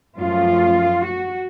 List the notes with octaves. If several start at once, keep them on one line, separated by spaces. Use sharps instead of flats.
F#2 F3 A3 C#4 F4
F#4